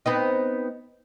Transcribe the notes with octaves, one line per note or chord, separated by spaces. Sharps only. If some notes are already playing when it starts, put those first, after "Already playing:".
B3 C4 D#4